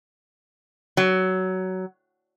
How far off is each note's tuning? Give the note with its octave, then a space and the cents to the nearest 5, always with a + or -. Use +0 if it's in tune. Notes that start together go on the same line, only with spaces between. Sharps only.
F#3 +15